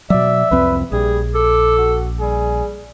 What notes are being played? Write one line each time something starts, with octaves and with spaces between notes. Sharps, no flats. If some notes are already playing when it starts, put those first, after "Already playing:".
B2 F#3 D5 E5
C2 F2 C4 B4
A#1 G3 G#4
A4 D6
F#4
G3 G#4